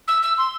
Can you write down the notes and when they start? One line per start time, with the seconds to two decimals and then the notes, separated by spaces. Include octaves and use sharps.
0.07 E6
0.22 E6
0.38 C6